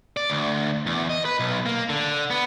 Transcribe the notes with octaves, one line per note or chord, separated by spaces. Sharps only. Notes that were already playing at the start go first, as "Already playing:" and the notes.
D5
D2
E2
D#5
B4
B1
A#3
D3
B3